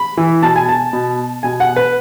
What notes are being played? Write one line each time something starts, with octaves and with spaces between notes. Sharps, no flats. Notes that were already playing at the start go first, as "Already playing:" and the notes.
Already playing: B5
E3
B2 A5
G#5
A5
B2
B2 G#5
F#5
B4